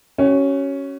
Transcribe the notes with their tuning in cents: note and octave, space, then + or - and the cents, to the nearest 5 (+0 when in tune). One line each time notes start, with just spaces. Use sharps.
C#4 +0 F#4 +35